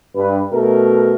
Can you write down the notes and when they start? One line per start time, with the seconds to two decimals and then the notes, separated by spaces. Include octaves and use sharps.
0.16 G2 B4
0.52 B2 A3 A#4